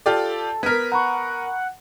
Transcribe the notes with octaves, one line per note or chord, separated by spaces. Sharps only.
F4 G4 A4 D5
B3 A#4 F6 F#6 G#6 B6
F#5 A#5 B5 C#6